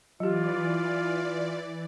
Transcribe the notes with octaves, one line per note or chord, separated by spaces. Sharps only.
E3 F#3 F4 G4 D5